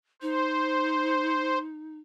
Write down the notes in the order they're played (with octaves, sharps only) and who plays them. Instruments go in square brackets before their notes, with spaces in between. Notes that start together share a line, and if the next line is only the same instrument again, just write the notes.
[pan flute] D#4 [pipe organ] C5